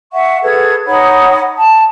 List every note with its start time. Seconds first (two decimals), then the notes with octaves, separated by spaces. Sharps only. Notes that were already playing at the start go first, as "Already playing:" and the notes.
0.13 E5 F#5 C#6
0.42 G#4 A4 B4 G#6
0.86 D#4 C#5 F#5 B5
1.57 A5